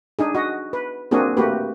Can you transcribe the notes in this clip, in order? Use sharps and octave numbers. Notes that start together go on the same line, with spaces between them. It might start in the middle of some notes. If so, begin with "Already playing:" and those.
D4 D#4 G#4
F#4 D#5
B4
A#3 C4 D4 F#4 G#4
A3 A#3 F#4 G4 B4